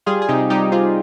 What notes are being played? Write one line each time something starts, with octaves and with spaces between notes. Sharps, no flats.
G3 F4 G#4
G#4
C3 D#4 G4
G3 D#4 G4
C4 F4 G#4